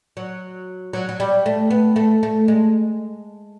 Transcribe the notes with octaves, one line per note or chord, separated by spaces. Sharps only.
F#3
F#3
F#3
G3
A3
B3
A3
A3
G#3